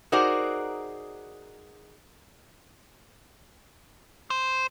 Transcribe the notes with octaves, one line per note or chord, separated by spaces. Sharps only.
D#4 F#4 G#4 A#4 C5 D5
C5